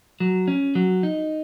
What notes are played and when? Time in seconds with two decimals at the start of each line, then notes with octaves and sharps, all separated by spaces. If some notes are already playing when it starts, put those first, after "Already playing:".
0.20 F#3
0.48 C#4
0.75 F#3
1.03 D#4